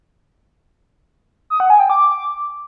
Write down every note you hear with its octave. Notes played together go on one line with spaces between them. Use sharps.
D#6
F#5
G#5
G5
D6